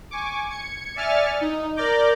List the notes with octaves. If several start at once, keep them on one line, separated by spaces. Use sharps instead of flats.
G#5 C#6 D6
G#6 C#7
D5 E5 G#5 F6 A6 C#7
D#4
A#4 D5 A#5 D6 G6